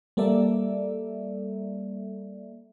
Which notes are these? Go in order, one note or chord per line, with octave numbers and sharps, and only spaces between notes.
G3 A#3 A4 D5 E5